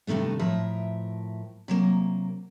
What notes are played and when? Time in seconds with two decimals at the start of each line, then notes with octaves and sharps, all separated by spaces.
0.07 G2 C3 D#3 A3 B3
0.39 A2 F3 A#4 E5
1.68 C3 F#3 A#3